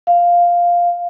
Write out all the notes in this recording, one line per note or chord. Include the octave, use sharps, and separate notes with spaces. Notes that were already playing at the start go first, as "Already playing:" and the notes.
F5